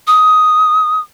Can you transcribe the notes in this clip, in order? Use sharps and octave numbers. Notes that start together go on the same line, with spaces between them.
D#6